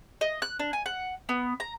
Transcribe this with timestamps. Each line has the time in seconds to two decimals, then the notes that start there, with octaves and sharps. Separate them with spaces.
0.21 D#5
0.42 F#6
0.59 D4
0.73 G#5
0.86 F#5
1.29 B3
1.60 A#5